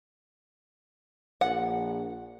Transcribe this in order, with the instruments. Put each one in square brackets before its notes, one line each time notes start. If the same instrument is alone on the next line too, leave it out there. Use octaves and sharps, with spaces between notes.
[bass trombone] A#1 [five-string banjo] F#5